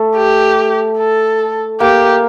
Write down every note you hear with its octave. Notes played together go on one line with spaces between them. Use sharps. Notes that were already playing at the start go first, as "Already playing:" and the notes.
Already playing: A3
G4
A4
A#3 G4